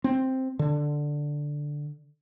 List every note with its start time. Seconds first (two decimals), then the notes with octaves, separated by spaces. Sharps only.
0.04 C4
0.59 D3